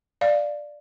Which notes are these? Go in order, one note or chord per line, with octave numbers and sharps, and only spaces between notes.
D5 F5